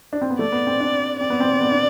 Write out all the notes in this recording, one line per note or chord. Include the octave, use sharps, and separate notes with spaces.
D4
C4
B3
A3 D5
B3
C4
D4
C4 D5
B3
C4
B3
B3
D4